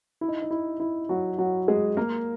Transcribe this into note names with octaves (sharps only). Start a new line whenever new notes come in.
E4
D#4
D#4
E4
E4
F#3 F#4
F#3 F#4
G#3 G#4
A#3 A#4